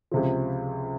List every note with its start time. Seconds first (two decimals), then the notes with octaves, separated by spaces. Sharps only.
0.11 C#2 C3 F3